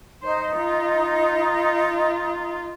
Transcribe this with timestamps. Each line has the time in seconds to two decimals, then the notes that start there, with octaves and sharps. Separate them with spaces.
0.22 D#4 C5
0.56 F4